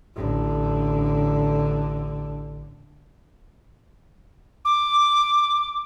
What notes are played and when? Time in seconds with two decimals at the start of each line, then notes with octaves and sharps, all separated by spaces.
0.15 A1 D3
4.65 D6